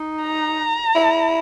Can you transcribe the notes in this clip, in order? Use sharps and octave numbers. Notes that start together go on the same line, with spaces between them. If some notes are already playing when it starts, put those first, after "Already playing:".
Already playing: D#4
A#5
E4